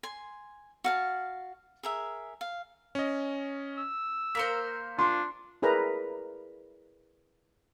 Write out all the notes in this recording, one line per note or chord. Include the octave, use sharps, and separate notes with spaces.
G#5 C6
F#4 F5 A5
G#4 A#4 E5
F5
C#4 D#5
E6
A#3 A#4 C5 B6 C#7
D4 F4 C6
E4 G#4 A#4 B4 D5 A#5